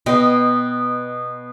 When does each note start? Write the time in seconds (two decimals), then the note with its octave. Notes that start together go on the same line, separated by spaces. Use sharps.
0.06 B2 D#5 G5